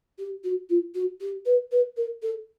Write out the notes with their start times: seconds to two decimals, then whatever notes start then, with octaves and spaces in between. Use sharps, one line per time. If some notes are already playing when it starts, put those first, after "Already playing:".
0.18 G4
0.44 F#4
0.69 F4
0.95 F#4
1.21 G4
1.46 B4
1.72 B4
1.97 A#4
2.22 A4